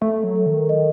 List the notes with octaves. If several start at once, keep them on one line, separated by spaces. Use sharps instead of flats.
A3 A4
F#3
A4
D#3
D#5